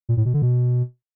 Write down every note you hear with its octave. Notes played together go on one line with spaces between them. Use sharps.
A#2
A2
B2
D3
B2